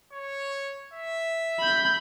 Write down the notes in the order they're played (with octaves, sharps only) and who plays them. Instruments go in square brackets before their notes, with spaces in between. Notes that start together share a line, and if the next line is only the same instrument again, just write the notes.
[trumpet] C#5
E5
[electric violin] B5 G6